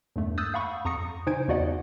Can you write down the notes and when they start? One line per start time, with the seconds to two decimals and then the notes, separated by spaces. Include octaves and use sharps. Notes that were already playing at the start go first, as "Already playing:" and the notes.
0.16 E2 G2 A3 A#3
0.38 D#6 E6 F#6 G6 A6
0.54 F5 F#5 B5 C#6
0.85 F2 A#5 C#6 D#6 A#6 C#7
1.27 C#3 D#4 C5 G#5 G#6 D7
1.48 E2 A#3 F#4 D5 D#5 F#5